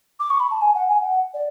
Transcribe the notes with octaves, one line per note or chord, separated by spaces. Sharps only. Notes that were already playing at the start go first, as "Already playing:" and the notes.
D6
C#6
B5
A5
G#5
F#5
G#5
F#5
D5